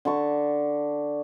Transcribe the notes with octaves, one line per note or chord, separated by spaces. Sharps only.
D3 A5 C#6